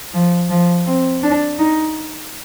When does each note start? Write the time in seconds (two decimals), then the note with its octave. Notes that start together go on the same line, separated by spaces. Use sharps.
0.14 F3
0.50 F3
0.87 C4
1.23 D4
1.58 D#4